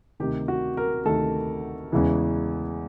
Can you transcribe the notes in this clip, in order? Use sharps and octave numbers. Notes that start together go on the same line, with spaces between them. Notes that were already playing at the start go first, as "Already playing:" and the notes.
D2 C3 D#3 G4
F#4
A#4
D2 C3 D#3 A4
E2 C#3 E3 G#3